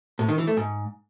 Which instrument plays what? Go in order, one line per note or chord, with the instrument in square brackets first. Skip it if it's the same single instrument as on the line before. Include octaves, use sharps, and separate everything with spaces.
[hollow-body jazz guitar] A2
D#3
E3
A3
G#2